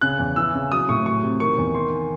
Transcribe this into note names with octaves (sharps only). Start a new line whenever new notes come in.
C#3 F#6
E2
E3 E6
C#3
F#3 D#6
A2 C#6
F#3 C#6
C3
D#3 C#6
E2
D#3 C6